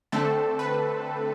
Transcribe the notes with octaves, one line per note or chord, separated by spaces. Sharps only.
D3 A3 C4 A4
B4